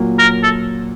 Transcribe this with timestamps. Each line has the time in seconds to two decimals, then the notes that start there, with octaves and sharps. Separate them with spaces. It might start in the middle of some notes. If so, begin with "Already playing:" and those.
Already playing: A#2 F#3 A#3
0.19 A#4
0.43 A4